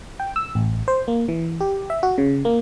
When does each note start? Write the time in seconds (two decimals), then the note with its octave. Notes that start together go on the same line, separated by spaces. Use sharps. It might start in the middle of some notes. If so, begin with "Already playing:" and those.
0.20 G5
0.36 E6
0.55 A1
0.88 C5
1.08 A#3
1.28 E3
1.60 G4
1.90 E5
2.03 F#4
2.18 C#3
2.45 A#3